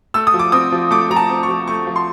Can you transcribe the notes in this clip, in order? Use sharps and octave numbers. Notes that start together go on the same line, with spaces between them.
A3 E6
D#6
F3
D6
C4 D#6
F3
A3 D6
F3 A#5
A5
C4
C#6
F3
A3 C#6
F3
C6